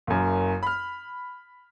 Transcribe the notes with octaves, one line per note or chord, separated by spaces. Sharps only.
F#1 F#2
B5 F6